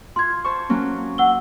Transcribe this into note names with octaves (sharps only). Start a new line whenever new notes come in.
F4 C6 G#6
C5 A5 C#6
F#3 A#3 C#4
F#5 E6 G7